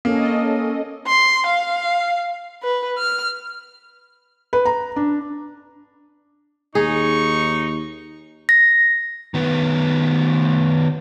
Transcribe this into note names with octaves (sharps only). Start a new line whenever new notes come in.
A#3 C#4 A4 D#5
C6
F5
B4
F6
B4
A#5
D4
D#2 D#4 G#4 C#6
A#6
D#3 B3